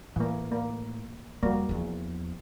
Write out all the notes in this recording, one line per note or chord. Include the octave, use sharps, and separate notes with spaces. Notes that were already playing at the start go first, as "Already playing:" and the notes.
A2 E3 A#3
A#3
F2 G3 A#3 F#4
E2 F3